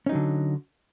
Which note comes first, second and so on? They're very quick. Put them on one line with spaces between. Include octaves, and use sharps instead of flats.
C#4 D#4 F#3 D3